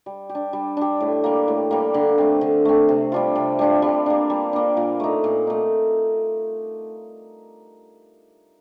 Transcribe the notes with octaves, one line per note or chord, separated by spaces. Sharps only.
G3
G4
D4
G3
D4 G4
A2
G3 A#3
A2
G3 A#3
D3
A3 C4
D3
A3 C4
C3
G3 D4 F4
C3
G3 D4 F4
G3
A#3 D4
G3
A#3 D4
A#2
A3 D#4
A#2
A3 D#4